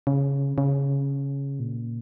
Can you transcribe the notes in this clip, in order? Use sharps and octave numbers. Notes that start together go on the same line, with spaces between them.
C#3
C#3
A#2